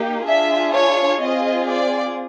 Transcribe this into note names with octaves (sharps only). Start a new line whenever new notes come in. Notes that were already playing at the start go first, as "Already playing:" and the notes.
Already playing: A#3 D#4 G4
D4 F4 G#4 E5
C#5
C4 F4 G#4 D#5
D5